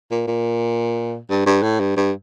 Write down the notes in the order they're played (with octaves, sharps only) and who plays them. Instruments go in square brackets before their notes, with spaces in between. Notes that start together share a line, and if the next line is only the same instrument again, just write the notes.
[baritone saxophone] A#2
A#2
G2
G2
A2
G2
G2